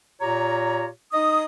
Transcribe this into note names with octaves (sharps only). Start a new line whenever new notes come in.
A#2 F4 G4 C#5 A#5
D#4 D#5 D#6